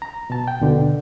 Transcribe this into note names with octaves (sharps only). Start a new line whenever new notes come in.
A#5
B2 A5
G5
D#2 B2 D3